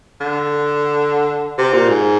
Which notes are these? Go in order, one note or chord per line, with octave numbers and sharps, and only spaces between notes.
D3
C3
A#2
G#2